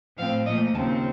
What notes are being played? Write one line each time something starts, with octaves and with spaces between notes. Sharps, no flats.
A2 F3 C4 F5
A#2 F3 A3 D#5
D#2 C#3 F3 C4 A5